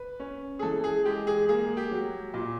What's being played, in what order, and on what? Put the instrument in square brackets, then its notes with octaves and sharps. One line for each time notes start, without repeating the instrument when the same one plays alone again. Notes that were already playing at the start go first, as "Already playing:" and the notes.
Already playing: [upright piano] B4
C#4
G#4
E3 A4
G#4
G#3 G4
G#4
A#3 G#4
G4
F#3
A#2